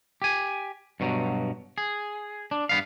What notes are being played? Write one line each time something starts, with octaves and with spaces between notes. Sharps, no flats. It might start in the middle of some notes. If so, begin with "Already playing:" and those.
G4 G#5
G2 B2 F#3
G#4
D4
G2 B3 F5